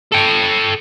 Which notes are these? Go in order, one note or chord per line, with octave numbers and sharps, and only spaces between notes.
A4 G5